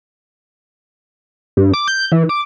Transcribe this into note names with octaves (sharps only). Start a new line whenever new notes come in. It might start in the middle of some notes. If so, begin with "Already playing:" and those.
G2
D6
G6
E3
D6